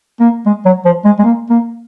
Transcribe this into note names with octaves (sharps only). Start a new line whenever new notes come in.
A#3
G#3
F#3
F3
G#3
G#3
A#3
A#3